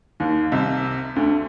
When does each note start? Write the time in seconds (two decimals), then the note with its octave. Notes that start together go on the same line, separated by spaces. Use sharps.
0.20 D#2 D#3
0.52 C2 C3
1.16 D2 D3